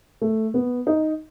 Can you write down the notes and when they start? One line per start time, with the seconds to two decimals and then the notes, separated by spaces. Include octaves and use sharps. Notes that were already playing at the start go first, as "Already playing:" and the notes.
0.21 A3
0.54 B3
0.87 D#4